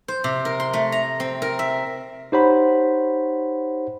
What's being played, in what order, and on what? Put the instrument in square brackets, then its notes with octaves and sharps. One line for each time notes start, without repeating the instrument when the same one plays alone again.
[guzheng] C5
C3
A#4
C6
A3
A#5
C4
A#4
E5
[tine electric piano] D#4 G4 C5 C#5 F#5 B5